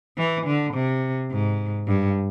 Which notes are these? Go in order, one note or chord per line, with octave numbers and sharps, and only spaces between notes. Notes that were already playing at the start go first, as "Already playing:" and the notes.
E3
D3
C3
G#2
G2